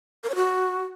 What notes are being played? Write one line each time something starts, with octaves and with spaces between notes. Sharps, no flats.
A#4
C#5
F#4